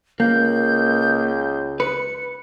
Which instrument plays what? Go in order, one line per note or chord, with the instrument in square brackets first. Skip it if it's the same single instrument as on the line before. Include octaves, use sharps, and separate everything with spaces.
[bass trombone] C#2 [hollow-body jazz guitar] A#3 [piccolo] G6
[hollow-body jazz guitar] B4 [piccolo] C#7